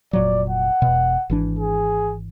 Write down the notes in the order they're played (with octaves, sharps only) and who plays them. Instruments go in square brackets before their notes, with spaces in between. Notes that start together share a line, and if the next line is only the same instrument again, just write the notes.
[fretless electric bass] F1 A#2 F#3 [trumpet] D5
[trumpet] F#5
[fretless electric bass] E1 B2
G#1 E3 D4
[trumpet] G#4